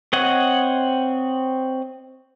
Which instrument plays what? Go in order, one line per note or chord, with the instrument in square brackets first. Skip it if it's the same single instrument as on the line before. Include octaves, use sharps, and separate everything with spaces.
[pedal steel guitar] C4 C#5 D#5 F#5